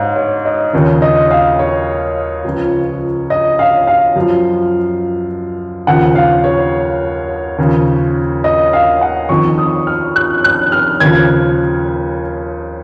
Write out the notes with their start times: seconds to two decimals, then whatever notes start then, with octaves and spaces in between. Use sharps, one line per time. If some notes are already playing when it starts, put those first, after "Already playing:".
Already playing: G#2 C#5 F5
0.16 C#5
0.45 D#5
0.73 D#2 C#3 F3 C#5
1.02 D#5
1.31 F5
1.59 C#5
2.44 C#2 C#3 F3
3.30 D#5
3.59 F5
3.87 F5
4.16 F#2 F3
5.87 D#2 C#3 F3 F#5
6.15 F5
6.44 C#5
7.58 D#2 C#3 F3
8.44 D#5
8.73 F5
9.01 F#5
9.29 F2 D#3 C#6
9.58 D#6
9.87 F6
10.16 F#6
10.44 F#6
10.72 F6
11.00 D#2 C#3 F3 G#6